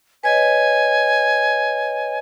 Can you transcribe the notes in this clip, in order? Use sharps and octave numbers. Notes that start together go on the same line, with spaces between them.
B4 C#5 D#5 G#5